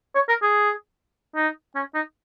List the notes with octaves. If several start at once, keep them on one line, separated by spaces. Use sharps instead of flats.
C#5
A#4
G#4
D#4
C#4
D#4